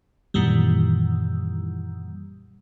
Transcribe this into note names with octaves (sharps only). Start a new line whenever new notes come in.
F#2 A#2 D#3 E3 G3